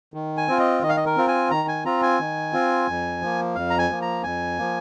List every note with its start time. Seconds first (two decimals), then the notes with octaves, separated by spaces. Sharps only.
0.14 D#3
0.37 G#5
0.48 C4 F4
0.59 D#5
0.82 D#3 D#5
0.89 F5
0.97 D#5
1.06 A#4
1.17 C4 F4
1.28 G#5
1.51 D#3 A#5
1.68 G#5
1.85 C4 F4 A#5
2.02 G#5
2.20 D#3
2.53 C4 F4
2.88 F2
3.22 F3 A#3
3.55 F2 F5
3.70 A#5
3.79 G#5
3.90 F3 A#3
4.02 A#5
4.23 F2 G#5
4.59 F3 A#3